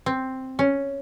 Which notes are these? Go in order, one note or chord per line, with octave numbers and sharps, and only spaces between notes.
C4
C#4